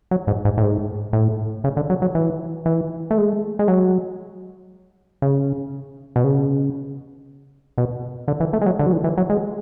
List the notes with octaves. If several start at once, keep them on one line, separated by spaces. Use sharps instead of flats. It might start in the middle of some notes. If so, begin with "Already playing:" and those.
F#3
G#2
G#2
A2
G#2
A2
C#3
D3
F#3
F#3
E3
E3
A3
G#3
G#3
F#3
C#3
B2
C#3
B2
D3
E3
A3
G#3
F#3
D3
F#3
E3
E3
F#3
G#3